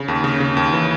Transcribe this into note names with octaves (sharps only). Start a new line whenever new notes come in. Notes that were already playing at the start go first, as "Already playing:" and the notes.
Already playing: C#3
D#2
C#3
C#3
D#2
E3